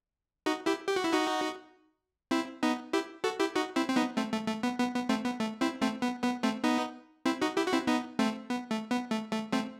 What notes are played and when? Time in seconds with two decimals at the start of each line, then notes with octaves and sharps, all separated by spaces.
0.46 D#4 F#4
0.66 E4 G4
0.87 G4
0.96 F#4
1.04 E4
1.13 D#4 F#4
2.31 C4 E4
2.63 B3 D#4
2.93 E4 G4
3.24 F#4 A4
3.40 E4 G4
3.56 D#4 F#4
3.76 C4 E4
3.89 C4
3.96 B3 D#4
4.17 A3 C4
4.32 A3
4.47 A3
4.63 B3
4.79 B3
4.95 B3
5.09 A3 C4
5.25 B3
5.40 A3
5.61 C4 E4
5.81 A3 C4
6.02 B3
6.23 B3
6.43 A3 C4
6.64 B3 D#4
7.26 C4 E4
7.41 D#4 F#4
7.57 E4 G4
7.67 F#4
7.73 C4 E4
7.87 B3 D#4
8.19 A3 C4
8.50 B3
8.71 A3
8.91 B3
9.11 A3
9.32 A3
9.53 A3 C4